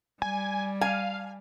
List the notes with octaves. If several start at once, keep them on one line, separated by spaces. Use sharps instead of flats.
G3 G#5
F5 G#5